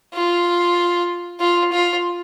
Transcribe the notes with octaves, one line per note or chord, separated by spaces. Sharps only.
F4
F4
F4